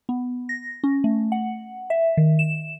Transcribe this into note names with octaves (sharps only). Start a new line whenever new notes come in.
B3
A#6
C#4
A3
F#5
E5
D#3
E7